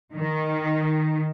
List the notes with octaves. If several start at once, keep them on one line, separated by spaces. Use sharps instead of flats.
D#3